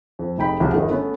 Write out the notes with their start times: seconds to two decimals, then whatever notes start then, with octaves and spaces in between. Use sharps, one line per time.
0.19 F2
0.38 F1 D#4 G5 B5
0.60 E1 C2 F3 G#4 F#5
0.74 G1 D#3
0.90 A3 B3 C#4